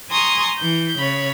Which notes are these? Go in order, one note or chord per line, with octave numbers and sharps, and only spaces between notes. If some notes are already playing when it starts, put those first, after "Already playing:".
G#5 A#5 C6 C#6 D#6
E3 G6
C#3 C#5 B5